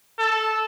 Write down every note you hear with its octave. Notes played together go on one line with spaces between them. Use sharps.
A4